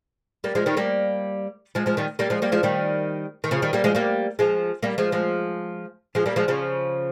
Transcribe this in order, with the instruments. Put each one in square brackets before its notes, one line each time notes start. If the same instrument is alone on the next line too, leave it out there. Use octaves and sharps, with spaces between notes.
[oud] G3 A#3
F3 G#3
D#3 G3
G3 A#3
F3 G#3
F3 G#3
D#3 G3
G3 A#3
F3 G#3
G3 A#3
F3 G#3
D#3 G3
D#3
C#3 F3
D#3 G3
G3 A#3
F3 G#3
G3 A#3
F3 G#3
G3 A#3
F3 G#3
F3 G#3
F3 G#3
G3 A#3
F3 G#3
C#3 F3